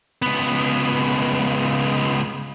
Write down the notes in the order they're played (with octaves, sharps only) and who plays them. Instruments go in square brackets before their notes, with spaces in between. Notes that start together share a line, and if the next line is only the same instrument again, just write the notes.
[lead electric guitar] C#2 B3